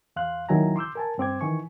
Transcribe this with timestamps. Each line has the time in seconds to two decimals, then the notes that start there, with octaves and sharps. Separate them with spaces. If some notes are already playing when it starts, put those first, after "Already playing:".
0.16 E2 F5 C6 F#6
0.49 D#2 D#3 F#3 E4 G#5 A#5
0.76 C6 D6 E6 G6
0.95 A#4 G#5 A5
1.18 G2 C4 D6 G#6
1.41 D#3 E3 G#5 C#6